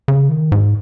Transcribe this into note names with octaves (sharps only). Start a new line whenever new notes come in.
C#3
D#3
G#2